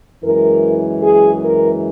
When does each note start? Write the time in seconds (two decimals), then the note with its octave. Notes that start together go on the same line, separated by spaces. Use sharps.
0.23 F#2 E3 G#3 A#4
1.02 G#4
1.42 A#4